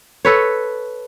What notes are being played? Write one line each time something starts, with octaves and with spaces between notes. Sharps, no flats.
A4 B4 C#5